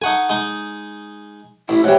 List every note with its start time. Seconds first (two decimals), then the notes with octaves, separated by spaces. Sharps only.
0.02 D#4 A4 F#5 G#5 C#6
0.30 G#3 D#4
1.69 A1 E4
1.84 G#2 E3 G4 C#5 F#5